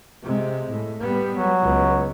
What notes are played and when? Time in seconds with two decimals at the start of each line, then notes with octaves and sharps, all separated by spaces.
0.23 C3 G#3
0.70 A2
1.00 G3 B3
1.31 F#3
1.62 C#2 B3